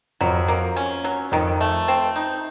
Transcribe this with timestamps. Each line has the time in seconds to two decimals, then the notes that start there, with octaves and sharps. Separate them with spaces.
0.21 F2 F#3
0.48 A#3
0.76 C#4
1.04 F#3
1.32 F2 D#3
1.61 A3
1.88 C4
2.16 D#4